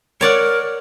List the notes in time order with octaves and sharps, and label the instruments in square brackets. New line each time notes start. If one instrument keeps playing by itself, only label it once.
[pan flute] A#4 [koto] C#5 D5 F#5